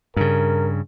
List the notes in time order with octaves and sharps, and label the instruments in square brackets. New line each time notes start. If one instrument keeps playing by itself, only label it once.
[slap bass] G2 C#3 [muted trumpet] A#4